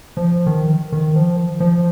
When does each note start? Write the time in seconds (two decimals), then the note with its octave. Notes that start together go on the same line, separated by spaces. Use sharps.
0.17 F3
0.47 D#3
0.92 D#3
1.16 F3
1.60 F3